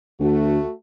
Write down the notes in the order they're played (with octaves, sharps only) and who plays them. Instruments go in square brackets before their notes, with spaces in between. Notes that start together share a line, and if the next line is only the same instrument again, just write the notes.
[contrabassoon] D2 [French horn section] A3 F#4